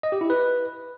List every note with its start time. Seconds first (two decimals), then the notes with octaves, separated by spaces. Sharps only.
0.03 D#5
0.12 G4
0.21 E4
0.30 B4